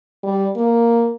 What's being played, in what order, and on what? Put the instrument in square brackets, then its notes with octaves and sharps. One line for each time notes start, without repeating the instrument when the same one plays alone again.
[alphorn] G3
A#3